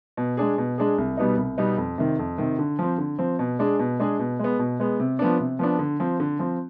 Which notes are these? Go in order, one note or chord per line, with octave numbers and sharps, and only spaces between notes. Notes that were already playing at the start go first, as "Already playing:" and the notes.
B2
G#3 D4 G#4
B2
G#3 D4 G#4
C2
B2 G3 B3 D#4
C2
B2 G3 B3 D#4
F2
C3 D#3
F2
C3 D#3
D3
F3 C4
D3
F3 C4
B2
G#3 D4 G#4
B2
G#3 D4 G#4
B2
G#3 B3
B2
G#3 B3
C3
F3 B3 D4
C3
F3 B3 D4
D3
F3 C4
D3
F3 C4